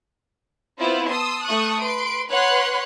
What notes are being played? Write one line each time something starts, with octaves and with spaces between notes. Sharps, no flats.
B3 C4 E4 F4 C5
A5 C6 D#6 E6
A3 C#6 D#6 F#6
B4 C6 D7
B4 C#5 F#5 C6 F#6